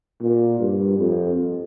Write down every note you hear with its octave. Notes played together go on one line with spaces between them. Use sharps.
A#2
G2
F2